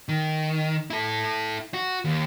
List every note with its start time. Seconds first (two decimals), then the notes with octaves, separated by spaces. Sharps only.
0.09 D#3
0.90 E4 A4
1.74 F#4
2.05 D#2